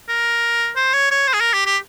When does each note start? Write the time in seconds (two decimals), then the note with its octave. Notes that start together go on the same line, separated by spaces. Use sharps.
0.09 A#4
0.76 C5
0.94 C#5
1.11 C#5
1.28 C5
1.34 G#4
1.41 A#4
1.53 G4
1.66 G4